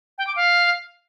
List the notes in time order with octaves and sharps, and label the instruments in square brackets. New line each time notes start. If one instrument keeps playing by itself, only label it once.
[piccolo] G5
D6
F5